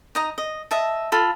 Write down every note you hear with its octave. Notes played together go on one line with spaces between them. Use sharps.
D#4 D#5 A#5
D#5
D#5 E5 A5
F4 A4 B5